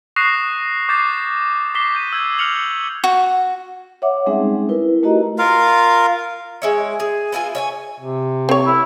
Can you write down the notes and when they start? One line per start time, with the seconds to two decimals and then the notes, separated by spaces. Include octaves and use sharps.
0.16 C#6 D#6 F#6 A#6 C7 E7
0.89 D6 G6 A6 C7
1.75 D6 B6 C7 G7
1.95 G6 B6 D#7
2.13 E6 G6 G#6
2.39 F6 C#7 F7 F#7
3.04 F#4
4.02 C#5 E5 F#5 D6
4.26 G3 G#3 C4 C#4 D#4 G#4
4.69 E4 A#4 B4
5.03 A3 D#4 F#4 G4 D#5 A#5
5.38 F4 A#4 F5
6.62 G#3 E4 C#5
7.00 G#4
7.32 B3 E4 F4 G#5
7.55 C#5 E5 G#5
8.00 C3
8.49 C4 C#5
8.66 E4